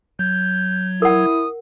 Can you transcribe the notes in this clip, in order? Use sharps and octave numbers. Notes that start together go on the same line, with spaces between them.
F#3 G6 G#6
E4 A#4 F#5 D#6